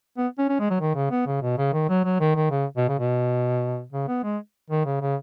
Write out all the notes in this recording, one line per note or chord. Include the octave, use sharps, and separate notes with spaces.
B3
C#4
C#4
G#3
F#3
D#3
C#3
B3
C#3
B2
C#3
D#3
F#3
F#3
D#3
D#3
C#3
B2
C#3
B2
C#3
B3
G#3
D#3
C#3
C#3